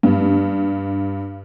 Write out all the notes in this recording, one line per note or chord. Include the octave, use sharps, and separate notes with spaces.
G2